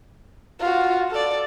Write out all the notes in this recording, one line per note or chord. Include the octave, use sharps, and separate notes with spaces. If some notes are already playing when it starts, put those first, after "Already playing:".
F4 F#4
A4 D5